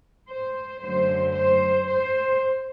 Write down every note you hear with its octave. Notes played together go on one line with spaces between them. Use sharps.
C5
F#2 D3 F#3 A3 C5
C5
C5